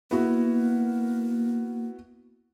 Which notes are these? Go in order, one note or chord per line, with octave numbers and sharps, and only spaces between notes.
A#3 B3 E4 F#4